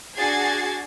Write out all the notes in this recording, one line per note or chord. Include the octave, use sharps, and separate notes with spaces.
D4 F#4 G#4 G#6 A6 C7